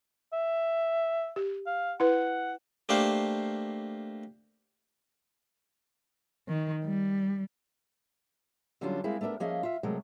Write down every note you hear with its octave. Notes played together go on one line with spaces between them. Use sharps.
E5
G4
F5
E4 B4 F#5
A3 A#3 D4 G4 C5 F5
D#3
G3
D3 F#3 G3 C#4 D4 F4
G#3 A#3 C4 E4 G#4
A3 B3 D4 A#4 E5
F3 A#3 C#4 G#4 D#5 E5
F4 E5
C3 F#3 G#3 A3 A#4